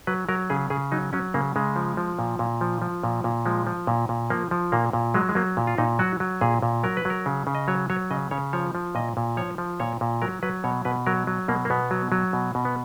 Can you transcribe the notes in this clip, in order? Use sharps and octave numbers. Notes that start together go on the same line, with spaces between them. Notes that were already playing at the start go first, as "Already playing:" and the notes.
F#3 B4
F#3 A#4
C#3 G#4
C#3 G#4
F#3 D#4
F#3 C#4
C#3 A#3
C#3 G#3
F3
F3
A#2
A#2
F3
F3
A#2
A#2
F3 G#3
F3
A#2
A#2
F3 A#3
F3
A#2 A#3
A#2
F#3 G#3
G#3
F#3 A#3
A#2
F4
A#2 D#4
F#3 F#4
F#3
A#2 G#4
A#2
F#3 A#4
B4
F#3 A#4
C#3
C#3
D#5
F#3 C#5
F#3 C#5
C#3 D#5
C#3 C#5
F3 C#5
F3
A#2 D#5
A#2
F3 C#5
F3
A#2 C#5
A#2
F#3 A#4
F#3 B4
B2 C#5
B2 B4
F#3 A#4
F#3
B2 A#3
A#3
B2 B3
F#3
F#3
B2
B2
B3